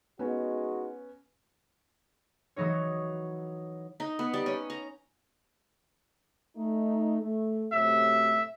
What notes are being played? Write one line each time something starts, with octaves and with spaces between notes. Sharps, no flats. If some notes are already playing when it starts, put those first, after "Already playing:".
G#3 B3 C#4 D#4 F#4
E3 F#3 D#4 C#5
D#4
B3
G3
C#4
A#5
A3 D#4
A3
F#2 A2 C3 E5